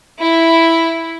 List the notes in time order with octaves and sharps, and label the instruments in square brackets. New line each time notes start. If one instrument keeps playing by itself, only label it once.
[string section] E4